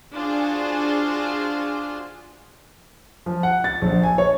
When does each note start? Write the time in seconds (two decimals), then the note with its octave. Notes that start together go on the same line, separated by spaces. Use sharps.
0.14 D4 F4 F#4 G#4 C5
3.26 F3
3.43 F#5
3.64 A6
3.82 A#1
4.03 G#5
4.18 C#5